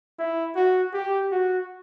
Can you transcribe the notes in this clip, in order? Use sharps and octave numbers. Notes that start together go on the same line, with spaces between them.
E4
F#4
G4
F#4